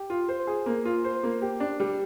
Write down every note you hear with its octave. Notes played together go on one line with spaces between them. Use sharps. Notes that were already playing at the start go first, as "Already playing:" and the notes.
Already playing: G4
F4
C5
G#4
A#3
F4
C5
A#3
G4
D4
G3